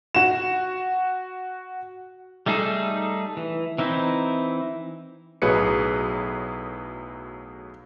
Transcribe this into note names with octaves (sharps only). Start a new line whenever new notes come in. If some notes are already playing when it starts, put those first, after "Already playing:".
F#4 E7
G3 A3 D#4 G#4 A4
E3
E3 C4 D#4 E4
B1 A2 F#3 G#4 B4 C#7